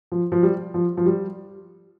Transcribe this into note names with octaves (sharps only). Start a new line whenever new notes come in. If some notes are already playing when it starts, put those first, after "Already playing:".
F3
F3
G3
F3
F3
G3